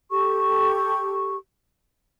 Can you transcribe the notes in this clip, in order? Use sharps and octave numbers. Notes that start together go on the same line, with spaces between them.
G4 A4 C#6